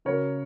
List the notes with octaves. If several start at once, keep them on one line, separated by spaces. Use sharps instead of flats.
C#3 F#3 A#3 A#4 C#5